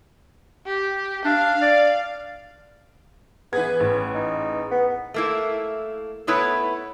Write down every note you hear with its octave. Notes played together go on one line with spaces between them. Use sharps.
G4
D4 F5
D5
E3 B3 G#4 B4 G#6
A1
D#4
B3
A3 A#3 E4
A3 B3 E4 B4 C#5